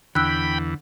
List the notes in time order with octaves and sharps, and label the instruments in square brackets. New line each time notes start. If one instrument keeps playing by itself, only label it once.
[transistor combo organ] E2 [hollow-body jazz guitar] D3 [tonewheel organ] G5 B5 [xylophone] E6 F#6